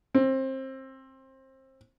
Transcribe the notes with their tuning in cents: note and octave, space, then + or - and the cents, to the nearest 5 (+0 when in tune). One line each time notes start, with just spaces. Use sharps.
C4 +25